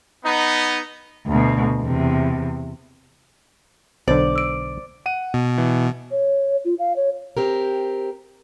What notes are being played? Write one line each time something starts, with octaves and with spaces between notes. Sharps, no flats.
B3 D#4
D2 B2
E2 C3
B1 D3 C5 D5
E6 D7
F#5 D#7
B2
E3
C#5
F4
F5
C#5
C4 G4 A#4